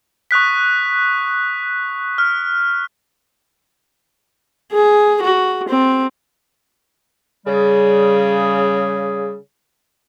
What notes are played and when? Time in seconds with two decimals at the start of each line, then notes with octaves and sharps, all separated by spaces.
0.31 C#6 D#6 F#6 B6
2.18 F6
4.72 G#4
5.22 F#4
5.69 C4
7.47 C#3 G3 G#4